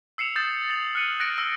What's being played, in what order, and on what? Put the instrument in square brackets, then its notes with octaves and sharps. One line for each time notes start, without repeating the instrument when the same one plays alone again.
[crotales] E6 C7 C#7 E7 F7
D#6 G6 A6 E7
A6 F7 F#7
F6 F#6 C#7 D#7 F#7
F#6 A6 A#6 C#7 D7
E6 A#6 G7